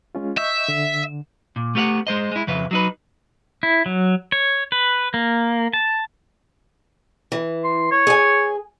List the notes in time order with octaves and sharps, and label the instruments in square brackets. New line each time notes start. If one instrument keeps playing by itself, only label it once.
[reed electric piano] G#3 C#4 F4
[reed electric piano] D#5 C#6 G6 [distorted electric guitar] E5
[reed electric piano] D3
[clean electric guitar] A#2
A3 B3 G4 F5 F#5
G#3 C5 D#5
G#3 E4
F2 C#3 B4 E5
F#3 D#4 B4
[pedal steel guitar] E4
F#3
C#5
B4
A#3
A5
[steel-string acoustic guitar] E3
[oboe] C6
C#5
[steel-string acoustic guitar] G#4 G#5